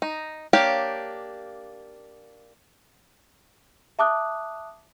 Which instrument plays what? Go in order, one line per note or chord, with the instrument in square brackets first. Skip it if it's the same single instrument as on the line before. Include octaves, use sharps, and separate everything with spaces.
[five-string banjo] D#4
A#3 D4 G4 C#5 F5
[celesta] E5 A5 D6 D#6 F#6